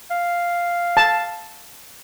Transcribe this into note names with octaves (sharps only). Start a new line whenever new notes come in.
F5
A5